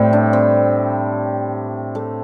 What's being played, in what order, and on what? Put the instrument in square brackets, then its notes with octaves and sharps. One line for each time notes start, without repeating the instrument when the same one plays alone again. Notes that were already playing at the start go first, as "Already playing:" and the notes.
Already playing: [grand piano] A2 [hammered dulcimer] G3 C4
[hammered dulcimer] D4
C4
A3